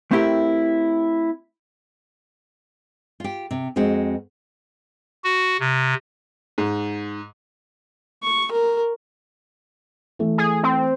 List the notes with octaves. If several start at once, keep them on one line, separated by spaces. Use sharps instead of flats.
A3 C4 E4 G4 A#4
F4 G4
C3
F2 G#3 C4 F#4
F#4
C3
G#2
C#6
A#4
E3 A3
G#4
C4